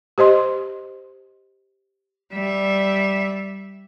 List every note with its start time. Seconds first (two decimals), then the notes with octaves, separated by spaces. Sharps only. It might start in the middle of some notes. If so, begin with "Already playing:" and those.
0.18 G4 C5 D#5 C6
2.32 G3 E5